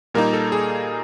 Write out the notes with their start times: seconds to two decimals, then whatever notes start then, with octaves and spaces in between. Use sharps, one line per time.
0.14 A#2 G3 A#3 D#4 A#4
0.33 A4
0.52 G#4